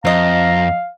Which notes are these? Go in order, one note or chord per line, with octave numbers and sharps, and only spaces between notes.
F2 C5 D#5 F5 A#5